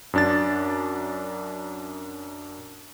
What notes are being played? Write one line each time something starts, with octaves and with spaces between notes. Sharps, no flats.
F#2 D4 A6